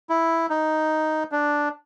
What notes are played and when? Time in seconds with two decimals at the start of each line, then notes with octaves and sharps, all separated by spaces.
0.09 E4
0.50 D#4
1.32 D4